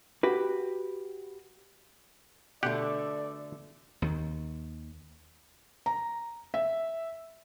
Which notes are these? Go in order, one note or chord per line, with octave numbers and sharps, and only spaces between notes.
F#4 G4 B4
B2 D3 A3 G4 D5 F#5
D#2 D#3
A#5
E5